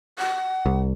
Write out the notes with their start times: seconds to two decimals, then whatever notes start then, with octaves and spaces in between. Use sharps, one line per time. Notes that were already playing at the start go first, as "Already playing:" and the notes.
0.19 F#5
0.66 C2